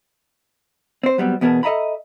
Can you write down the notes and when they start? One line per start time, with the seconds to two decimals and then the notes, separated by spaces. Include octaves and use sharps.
1.03 C4 C5
1.18 F#3 G3 B3 C4
1.41 E2 B2 B3 G#4 A#4 A5
1.63 A4 D#5 E5 A#5 B5